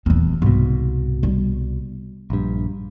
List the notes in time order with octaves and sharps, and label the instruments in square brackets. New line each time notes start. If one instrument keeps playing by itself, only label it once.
[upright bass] D#1 C4 [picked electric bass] E2
[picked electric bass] C2 B2 [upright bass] G#2
[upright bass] G3
[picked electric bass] A#1 G2